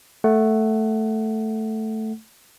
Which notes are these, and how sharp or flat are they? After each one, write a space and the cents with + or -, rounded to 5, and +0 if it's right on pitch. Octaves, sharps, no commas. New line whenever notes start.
A3 +0 F#5 +10